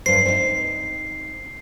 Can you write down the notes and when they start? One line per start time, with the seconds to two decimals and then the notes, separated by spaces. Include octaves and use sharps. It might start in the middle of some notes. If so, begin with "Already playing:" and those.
0.06 G2 C5 C7
0.26 C4 D#4